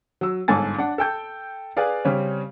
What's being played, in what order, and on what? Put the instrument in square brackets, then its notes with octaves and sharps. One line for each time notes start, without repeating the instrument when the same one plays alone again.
[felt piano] F#3 E6
G1 G#2 A4 G#5 A6
D4 F#5
A4 G5 G6
G#4 B4 D5 F5
C#3 G3 C4 C#4